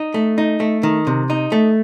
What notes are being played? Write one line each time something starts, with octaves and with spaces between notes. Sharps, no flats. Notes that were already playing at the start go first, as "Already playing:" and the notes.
Already playing: D#4
A3
D#4
A3
D#3
C3
D#4
A3